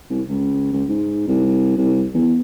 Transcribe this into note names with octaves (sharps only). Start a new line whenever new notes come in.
C2
C#2
C#2
G#2
C2
C2
E2